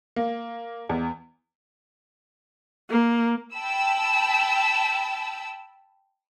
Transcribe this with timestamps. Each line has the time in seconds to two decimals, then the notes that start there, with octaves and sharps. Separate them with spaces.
0.16 A#3
0.89 E2
2.90 A#3
3.54 G5 A5 B5 E6